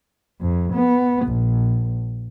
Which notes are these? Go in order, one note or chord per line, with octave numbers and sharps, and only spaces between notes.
F2
B3
A#1